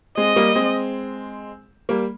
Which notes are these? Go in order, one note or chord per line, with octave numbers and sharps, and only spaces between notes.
G#3 C4 D#5
G3 A#3
G#3 C4
G3 A#3